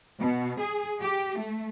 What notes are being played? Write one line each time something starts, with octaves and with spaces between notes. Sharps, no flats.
B2
G#4
G4
A3